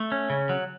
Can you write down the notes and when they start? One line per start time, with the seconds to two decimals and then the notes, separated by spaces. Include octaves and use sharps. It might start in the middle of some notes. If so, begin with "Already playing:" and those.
Already playing: A3
0.12 C#4
0.30 C#3
0.49 F#3